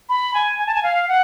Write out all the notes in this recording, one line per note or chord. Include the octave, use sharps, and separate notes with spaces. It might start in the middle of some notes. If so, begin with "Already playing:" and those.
B5
G#5
G#5
A5
G#5
F5
F#5